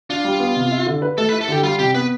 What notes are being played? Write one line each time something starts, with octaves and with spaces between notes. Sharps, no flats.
D4 F4
G3
B3
C3
E4
D3
B4
A3 A4
B4
E4
A4
D3 G4
G3 F4
C3 G4
B3 B4